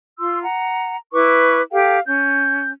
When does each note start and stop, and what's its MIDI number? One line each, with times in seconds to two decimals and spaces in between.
0.19 0.41 65
0.19 0.41 84
0.19 0.41 88
0.43 0.96 78
0.43 0.96 82
1.12 1.61 64
1.12 1.61 71
1.12 1.61 85
1.12 1.61 86
1.72 1.98 67
1.72 1.98 69
1.72 1.98 77
1.72 1.98 79
2.06 2.71 61
2.06 2.71 91